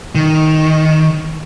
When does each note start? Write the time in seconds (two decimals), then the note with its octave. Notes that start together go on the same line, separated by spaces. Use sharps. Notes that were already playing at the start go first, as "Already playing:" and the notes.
0.15 D#3